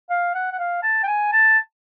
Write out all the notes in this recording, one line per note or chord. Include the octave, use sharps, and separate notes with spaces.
F5
F#5
F#5
F5
A5
G5
G#5
A5